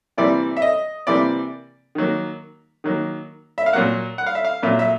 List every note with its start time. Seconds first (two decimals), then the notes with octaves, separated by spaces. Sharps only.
0.18 C3 E3 G3 A#3 D5
0.57 E5
0.62 D#5
1.07 C3 E3 G3 A#3 D5
1.95 D#3 F#3 A#3
2.84 D#3 F#3 A#3
3.58 E5
3.66 F5
3.73 A#2 F#3 A#3 F#5
4.18 F#5
4.26 F5
4.35 E5
4.45 F5
4.62 A#2 F#3 A#3 E5
4.79 E5